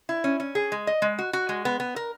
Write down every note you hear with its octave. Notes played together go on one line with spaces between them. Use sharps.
E4
C#4
C#4
G#4
G#3
D#5
G#3
F#4
F#4
G#3
B3
B3
A#4